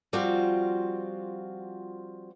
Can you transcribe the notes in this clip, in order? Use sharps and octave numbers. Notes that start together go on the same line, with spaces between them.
F3 G3 C4 F4 F#4 F5